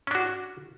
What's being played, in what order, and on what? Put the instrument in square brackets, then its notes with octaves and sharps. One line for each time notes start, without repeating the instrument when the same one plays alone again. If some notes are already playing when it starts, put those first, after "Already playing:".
[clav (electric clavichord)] C#4
D4
F#4